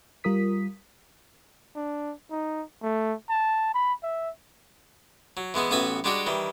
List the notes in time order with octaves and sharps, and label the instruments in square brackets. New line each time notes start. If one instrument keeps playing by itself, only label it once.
[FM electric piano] G3 F4 A#4 D#6 B6
[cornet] D4
D#4
A3
A5
B5
E5
[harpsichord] F#3
E3 G#3 B3 E4
A1 B3 F#4 B4 E5 G#5
G3 G#3 D4 F#4 G4
D#3 E3 G3